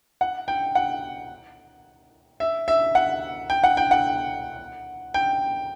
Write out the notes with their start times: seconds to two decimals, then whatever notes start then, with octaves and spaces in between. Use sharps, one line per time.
0.21 F#5
0.48 G5
0.75 F#5
2.40 E5
2.68 E5
2.95 F#5
3.50 G5
3.64 F#5
3.77 G5
3.91 F#5
5.14 G5